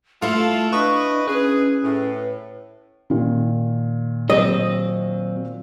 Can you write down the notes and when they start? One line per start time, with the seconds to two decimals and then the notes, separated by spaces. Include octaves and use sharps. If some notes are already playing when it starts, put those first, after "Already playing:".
0.22 A3 E4 F4 A4 F5
0.73 D4 B4 D#5 C#6
1.28 C#4 G#4 B4
1.83 A2
3.10 A#2 D#3
4.30 F#3 C4 D#5